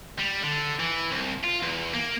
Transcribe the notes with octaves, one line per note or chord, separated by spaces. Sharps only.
G3
D3
E3
C2
F4
E2
A#3